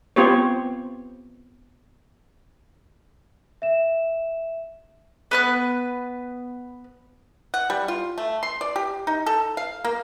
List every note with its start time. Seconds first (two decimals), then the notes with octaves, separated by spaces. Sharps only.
0.16 B3 C4 F4 G4 C5 C#5
3.62 E5 E7
5.31 B3 B4 F#6
7.54 F#5
7.70 G3
7.88 F4
8.18 A3
8.43 C6
8.61 D5
8.76 G4
9.07 D#4
9.26 A4
9.57 F5
9.84 A#3